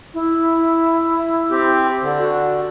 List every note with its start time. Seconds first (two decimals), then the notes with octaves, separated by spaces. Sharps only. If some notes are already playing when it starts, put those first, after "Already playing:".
0.14 E4
1.51 C4 G4
2.02 D3
2.19 F#4